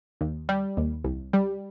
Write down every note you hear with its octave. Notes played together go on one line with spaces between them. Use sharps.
D#2
G3
D#2
C2
G3